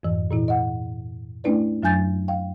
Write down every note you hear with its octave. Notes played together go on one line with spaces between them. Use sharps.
F2 G#2 E3
A#2 E3 E4
D#5 F#5
A3 C#4 D4 E4 B4 D5
F#2 F#3 D4 G#5 G6 A6
F5 G5